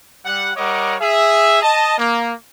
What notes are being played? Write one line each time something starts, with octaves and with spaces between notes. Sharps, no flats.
G3 F#5
G3 A#4 C#5 D#5 F#5 D6
G#4 E5
D#5 A5
A#3